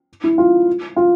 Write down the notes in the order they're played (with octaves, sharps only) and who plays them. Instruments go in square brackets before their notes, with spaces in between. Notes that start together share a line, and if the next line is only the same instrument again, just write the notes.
[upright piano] E4
F4
F4